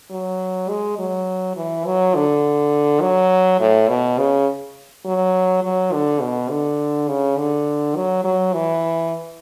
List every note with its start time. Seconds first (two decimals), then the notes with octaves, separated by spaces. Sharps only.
0.11 F#3
0.69 G#3
0.99 F#3
1.57 E3
1.85 F#3
2.15 D3
3.01 F#3
3.60 A2
3.89 B2
4.18 C#3
5.05 F#3
5.64 F#3
5.93 D3
6.21 B2
6.50 D3
7.09 C#3
7.38 D3
7.96 F#3
8.24 F#3
8.53 E3